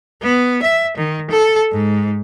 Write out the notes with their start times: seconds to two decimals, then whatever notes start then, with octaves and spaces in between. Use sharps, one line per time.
0.22 B3
0.62 E5
0.97 D#3
1.31 A4
1.72 G#2